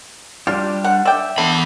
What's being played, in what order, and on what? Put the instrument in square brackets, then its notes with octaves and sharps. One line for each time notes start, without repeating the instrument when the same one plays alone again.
[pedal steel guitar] G3 D4 G4 [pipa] F4
[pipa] F#5
[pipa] D5 G5 [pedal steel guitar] E5
[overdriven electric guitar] E2 B5 [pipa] D3